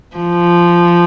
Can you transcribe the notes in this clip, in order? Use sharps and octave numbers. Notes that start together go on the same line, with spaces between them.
F3